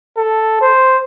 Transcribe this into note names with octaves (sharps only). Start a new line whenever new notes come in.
A4
C5